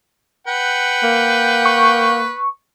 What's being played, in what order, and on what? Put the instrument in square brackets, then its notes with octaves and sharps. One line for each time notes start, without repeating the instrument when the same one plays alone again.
[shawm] B4 [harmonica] F#5 G5
[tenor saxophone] A#3
[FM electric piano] C#6